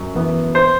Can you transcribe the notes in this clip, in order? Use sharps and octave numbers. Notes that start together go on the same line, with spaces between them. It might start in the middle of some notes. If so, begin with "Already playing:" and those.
Already playing: F#2
E3 B3
C5